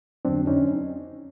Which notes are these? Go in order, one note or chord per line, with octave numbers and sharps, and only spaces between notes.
F2 D3 F#3 C4 D4
C#4 D#4